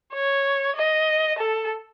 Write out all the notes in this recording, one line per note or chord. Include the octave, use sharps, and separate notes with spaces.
C#5
D#5
A4